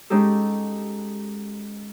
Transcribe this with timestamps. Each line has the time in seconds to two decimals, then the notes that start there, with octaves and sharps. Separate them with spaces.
0.10 G#3 C#4 D#4 G4 A4